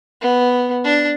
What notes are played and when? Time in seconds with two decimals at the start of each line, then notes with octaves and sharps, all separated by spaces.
0.21 B3
0.84 D4